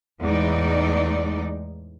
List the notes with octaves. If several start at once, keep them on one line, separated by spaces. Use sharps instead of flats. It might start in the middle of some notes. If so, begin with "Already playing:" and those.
E2 A2 G#3 D#4 D5